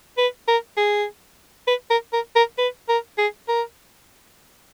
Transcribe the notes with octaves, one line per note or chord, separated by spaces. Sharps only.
B4
A#4
G#4
B4
A#4
A#4
A#4
B4
A#4
G#4
A#4